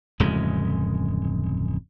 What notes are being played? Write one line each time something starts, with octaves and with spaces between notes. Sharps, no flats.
D1 F2 C#3 G#3